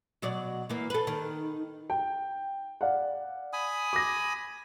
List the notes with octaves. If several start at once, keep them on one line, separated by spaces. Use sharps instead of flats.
B2 F#3 D5
E3 A#3
A4 B4
D#3
G5
D5 F5 F#5
G#5 B5 D#6
D6 A#6